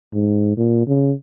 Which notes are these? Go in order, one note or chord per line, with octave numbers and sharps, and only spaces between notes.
G#2
A#2
C#3